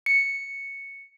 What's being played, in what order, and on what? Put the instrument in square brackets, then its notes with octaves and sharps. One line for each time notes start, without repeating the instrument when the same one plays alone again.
[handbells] C#7